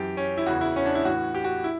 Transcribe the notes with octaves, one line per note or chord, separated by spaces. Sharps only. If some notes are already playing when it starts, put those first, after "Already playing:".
Already playing: F#2 E3 G4
C#4
E4
E2 C#3 E3 F#4
E4
C#4
D4
E4
A2 E3 F#4
G4
F#4
E4